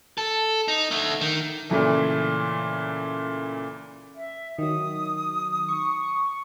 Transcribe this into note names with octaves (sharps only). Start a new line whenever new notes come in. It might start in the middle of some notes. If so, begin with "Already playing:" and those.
A4
D#4
D3 A3
D#3
A#2 C#3 E3 A3
E5
D#3 F#3 D#6
C#6